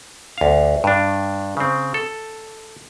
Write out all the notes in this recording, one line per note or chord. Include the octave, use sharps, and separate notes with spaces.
D2 F5
G2 D4
C#3 C4
A4